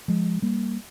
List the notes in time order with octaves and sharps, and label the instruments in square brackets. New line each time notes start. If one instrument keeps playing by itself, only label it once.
[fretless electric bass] F3 G#3
G3 A#3